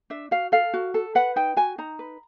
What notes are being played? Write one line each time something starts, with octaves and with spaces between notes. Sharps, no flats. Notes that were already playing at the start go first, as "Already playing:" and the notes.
D4 E5
F#4 F5
A4 F5
F#4
A4
B4 F#5
D#4 G5
F#4 G#5
D#4 A#5
B4